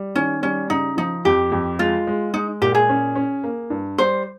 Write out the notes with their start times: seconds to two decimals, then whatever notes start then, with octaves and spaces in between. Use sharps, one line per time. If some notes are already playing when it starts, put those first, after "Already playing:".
Already playing: G3
0.15 D#3 C#4
0.43 G3 C#4
0.70 C#3 D#4
0.97 F3 D#4
1.25 F2 G4
1.52 F2
1.79 G#3 F4
2.07 G#3
2.33 G#3 D#4
2.62 A#2 G4
2.75 G#4
2.89 C#4
3.15 C#4
3.44 A#3
3.70 G2
3.98 G3 C5